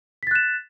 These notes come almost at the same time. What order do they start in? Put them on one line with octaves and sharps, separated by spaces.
B6 A6 F#6 E7